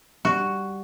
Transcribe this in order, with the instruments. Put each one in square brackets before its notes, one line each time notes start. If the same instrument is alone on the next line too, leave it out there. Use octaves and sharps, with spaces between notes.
[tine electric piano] G3 [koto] F#4